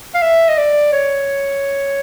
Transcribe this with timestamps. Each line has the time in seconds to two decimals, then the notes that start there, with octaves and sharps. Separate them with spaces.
0.15 F5
0.22 E5
0.49 D#5
0.58 D5
0.93 C#5